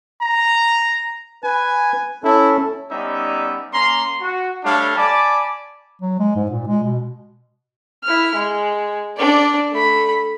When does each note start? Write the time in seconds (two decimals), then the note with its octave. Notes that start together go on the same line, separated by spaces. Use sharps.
0.21 A#5
1.44 B4 G#5
2.24 C#4 E4 A4
2.90 G3 B3 C#4 D#4 D5 E5
3.73 A#3 C#4 A#5 C6
4.21 F#4
4.64 G3 A3 D4 A4 C#5 F5
4.96 D5 G#5 A5 B5 D6
6.02 F#3
6.20 G#3
6.36 G#2
6.50 A#2
6.68 G#3
6.83 B2
8.04 E4 F6
8.35 G#3
9.18 D4 D5
9.72 A3 B5